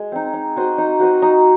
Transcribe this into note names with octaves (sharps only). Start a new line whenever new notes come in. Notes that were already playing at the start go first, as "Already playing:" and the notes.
Already playing: G#3
C4 D#4
D#4
F#4 C5 D#5
D#4
F#4 C5 D#5
D#4